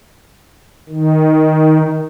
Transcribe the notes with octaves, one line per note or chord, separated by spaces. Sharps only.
D#3